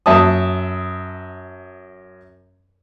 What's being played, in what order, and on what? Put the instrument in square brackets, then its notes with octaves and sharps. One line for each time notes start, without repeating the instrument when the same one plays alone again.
[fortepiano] F#2 E5 A5 D#6